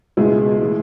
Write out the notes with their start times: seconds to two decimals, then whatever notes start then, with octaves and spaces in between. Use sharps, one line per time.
0.17 C#2 B2 G#3 E4 G#4
0.61 A2 E3 G#3